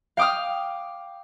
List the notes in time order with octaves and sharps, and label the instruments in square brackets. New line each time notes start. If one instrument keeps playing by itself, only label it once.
[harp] F5 G5 D6 D#6 F6